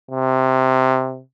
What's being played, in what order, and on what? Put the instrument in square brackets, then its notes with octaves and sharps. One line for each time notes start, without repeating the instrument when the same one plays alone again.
[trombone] C3